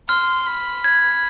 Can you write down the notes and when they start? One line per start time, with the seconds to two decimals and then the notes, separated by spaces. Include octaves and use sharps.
0.08 C6 F6
0.46 B5
0.84 G#6